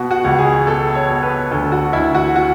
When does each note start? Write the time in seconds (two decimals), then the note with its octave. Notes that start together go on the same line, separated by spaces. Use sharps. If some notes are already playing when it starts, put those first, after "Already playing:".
Already playing: B2 F#4
0.11 F#4
0.24 C#2
0.39 G#4
0.66 B2 A4
0.95 C#5
1.09 B2
1.23 B4
1.51 D2 A4
1.72 F#4
1.93 D2 E4
2.15 F#4
2.36 F#4